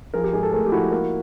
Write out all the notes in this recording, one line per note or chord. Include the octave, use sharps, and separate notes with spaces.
F3 G#4 A#4
G4
G#2 G#4
A4
A3 G#4 A#4
G4
F3 E4 F#4
A#3